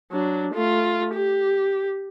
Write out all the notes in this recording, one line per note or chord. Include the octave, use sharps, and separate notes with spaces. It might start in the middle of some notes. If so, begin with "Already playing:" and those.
F#3 D4
A3 F4
G4